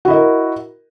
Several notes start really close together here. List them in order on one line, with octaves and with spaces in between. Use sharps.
F#4 E4 D#5 A#4